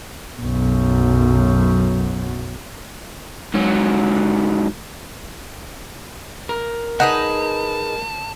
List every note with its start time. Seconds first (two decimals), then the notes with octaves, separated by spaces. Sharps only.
0.40 B1 F#2
3.54 G#2 F#3
6.49 A#4
7.00 D#4 G#4 B4 F#5 A5